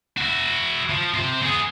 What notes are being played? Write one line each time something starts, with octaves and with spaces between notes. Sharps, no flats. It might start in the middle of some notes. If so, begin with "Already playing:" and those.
E4 F#4
F3
C3 C5
B3 G#4